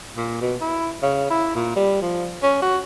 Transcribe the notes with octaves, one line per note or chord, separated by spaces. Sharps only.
A#2
B2
E4
C#3
E4
A#2
G3
F3
C#4
F#4